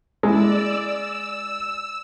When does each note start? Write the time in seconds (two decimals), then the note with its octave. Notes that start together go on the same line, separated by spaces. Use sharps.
0.23 G#3 E4 D5 E6
0.82 E6